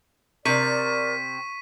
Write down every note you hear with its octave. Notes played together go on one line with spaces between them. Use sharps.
C3 A#4 D5 C#6 B6 D#7